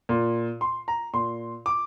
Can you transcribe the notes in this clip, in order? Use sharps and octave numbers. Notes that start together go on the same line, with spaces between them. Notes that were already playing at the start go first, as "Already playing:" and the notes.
A#2
C6
A#5
A#2 C6
D6